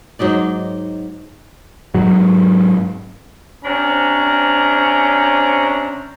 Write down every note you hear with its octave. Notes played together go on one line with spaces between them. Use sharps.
G#2 F#3 D#4 D5
G#2 F#3
C3 C#4 D4 C5 A#5